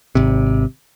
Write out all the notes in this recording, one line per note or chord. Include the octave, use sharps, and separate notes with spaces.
G#1 C3